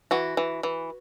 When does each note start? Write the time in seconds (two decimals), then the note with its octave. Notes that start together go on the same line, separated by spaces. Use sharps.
0.11 E3 F#4
0.37 E3
0.63 E3